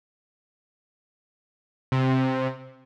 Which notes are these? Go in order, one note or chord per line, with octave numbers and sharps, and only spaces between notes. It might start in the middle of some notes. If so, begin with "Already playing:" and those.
C3